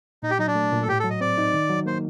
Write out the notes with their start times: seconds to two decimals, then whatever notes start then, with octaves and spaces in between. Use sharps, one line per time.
0.23 A#2 D#4
0.31 G4
0.39 F#3 D#4
0.47 D4
0.55 A3
0.72 A#2
0.83 A4
0.88 A2 G4
1.00 F#3 A4
1.10 D#5
1.21 C4 D5
1.38 D#4
1.54 D#3
1.70 F#3
1.86 A#3 C5